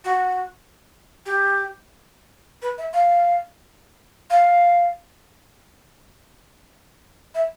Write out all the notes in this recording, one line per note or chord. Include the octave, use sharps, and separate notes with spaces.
F#4
G4
B4
E5
F5
F5
E5